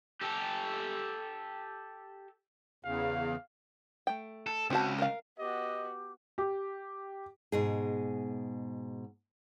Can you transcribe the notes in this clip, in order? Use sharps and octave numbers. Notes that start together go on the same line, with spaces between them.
G4 A4
E2 C#3 F5
A3 G5
A4
C#2 C4 F#4 A5
A#4 F5
B3 F#4 G4 D#5
G4
G#2 B2 G#4